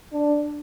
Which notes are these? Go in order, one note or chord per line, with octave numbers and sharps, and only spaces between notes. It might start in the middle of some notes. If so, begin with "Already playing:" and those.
D4